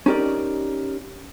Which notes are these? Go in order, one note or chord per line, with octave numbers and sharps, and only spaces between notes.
C#4 D#4 G4 A#4 D5